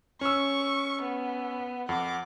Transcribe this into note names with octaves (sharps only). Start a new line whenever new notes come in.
C#4 C#6 E6
B3
F2 F#5 D6